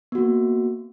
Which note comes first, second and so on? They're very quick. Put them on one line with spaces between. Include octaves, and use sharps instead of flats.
B3 F#4 A#3